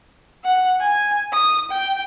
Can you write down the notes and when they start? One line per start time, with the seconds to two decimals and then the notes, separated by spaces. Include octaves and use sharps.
0.44 F#5
0.80 G#5
1.32 D#6
1.71 G5